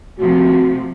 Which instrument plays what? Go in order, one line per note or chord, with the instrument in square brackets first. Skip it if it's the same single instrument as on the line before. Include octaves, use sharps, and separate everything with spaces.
[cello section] C3 F3 A3 [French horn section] F#4